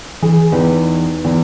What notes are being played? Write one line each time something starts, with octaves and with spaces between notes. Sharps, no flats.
E3 G#4
E2 D#4 G4 B4
E2